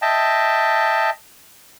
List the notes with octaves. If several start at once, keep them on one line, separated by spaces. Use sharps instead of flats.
D#5 E5 G5 A5